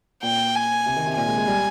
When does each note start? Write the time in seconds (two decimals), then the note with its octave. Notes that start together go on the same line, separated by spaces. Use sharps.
0.23 A#2 G5
0.55 G#5
0.86 C3
0.96 D#3
1.06 C3
1.16 A#2 G#5
1.27 G#3
1.38 G#3
1.47 G3